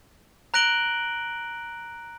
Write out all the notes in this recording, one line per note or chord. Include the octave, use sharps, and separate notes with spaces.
A#5 F#6 A#6 D7 F#7 G7